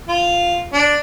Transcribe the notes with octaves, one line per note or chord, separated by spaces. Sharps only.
F4
D4